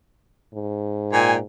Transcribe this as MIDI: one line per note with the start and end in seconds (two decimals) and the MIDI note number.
0.53 1.43 44
1.13 1.36 46
1.13 1.36 79
1.13 1.36 80